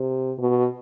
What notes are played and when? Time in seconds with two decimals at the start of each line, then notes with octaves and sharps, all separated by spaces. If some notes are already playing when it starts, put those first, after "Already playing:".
Already playing: C3
0.38 B2